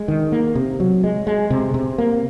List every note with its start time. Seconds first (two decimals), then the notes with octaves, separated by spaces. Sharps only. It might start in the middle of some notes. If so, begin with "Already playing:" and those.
Already playing: G#3
0.08 D#3
0.32 A#3
0.55 C3
0.80 F#3
1.04 G#3
1.27 G#3
1.50 C3
1.74 C3
1.98 A#3